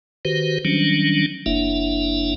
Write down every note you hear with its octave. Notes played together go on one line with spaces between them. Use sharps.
D#3 F#4 G4 B4 C5
D#3 F#3 G3 C#4 D4
F#1 A#3 D4 E4 E5